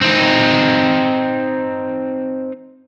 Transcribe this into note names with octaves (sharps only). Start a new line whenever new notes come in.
C4 D#4